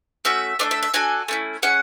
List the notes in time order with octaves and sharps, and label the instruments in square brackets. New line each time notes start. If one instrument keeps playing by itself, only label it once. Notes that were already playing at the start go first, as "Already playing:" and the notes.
[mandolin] A3 C#4 F#4 E5
A3 D4 A4 D5
E5
E5
D4 F#4 A4 G#5
A3 C#4 E4
C#4 G#4 F#5